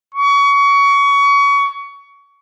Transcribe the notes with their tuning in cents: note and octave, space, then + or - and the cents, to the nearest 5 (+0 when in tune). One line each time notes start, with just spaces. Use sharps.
C#6 +25